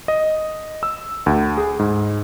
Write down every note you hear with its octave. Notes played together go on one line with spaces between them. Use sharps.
D#5
E6
D2
G#4
G#2